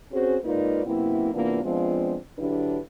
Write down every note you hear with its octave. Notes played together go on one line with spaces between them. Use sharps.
C4 C#4 F#4 G#4 C5
G#2 A#3 D#4 F4 B4 D5
F#2 C3 A#3 B3 E4
C3 E3 A#3 B3 D4 F4
F3 G#3 B3 C4 D4 F4
D3 F#3 D4 E4 G4 B4